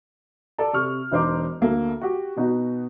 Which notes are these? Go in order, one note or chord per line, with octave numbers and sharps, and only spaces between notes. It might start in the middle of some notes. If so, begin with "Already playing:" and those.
A4 D5 A5
C3 C#6 F6
E1 D#4 C5 D6
D2 A#3 A4
F#4 G4
B2 B3 D#4 F#4